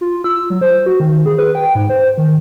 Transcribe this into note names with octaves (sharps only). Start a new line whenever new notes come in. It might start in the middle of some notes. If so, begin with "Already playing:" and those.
F4
E6
F#3
C5
F#4
D#3
G#4
B4
G5
G#2
C5
D#3